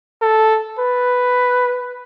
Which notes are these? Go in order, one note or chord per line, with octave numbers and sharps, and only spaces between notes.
A4
B4